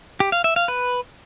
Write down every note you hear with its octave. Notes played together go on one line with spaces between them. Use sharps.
G4
F5
E5
F5
B4